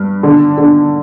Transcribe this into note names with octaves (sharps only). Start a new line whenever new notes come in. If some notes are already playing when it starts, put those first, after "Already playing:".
Already playing: G2
D3
D3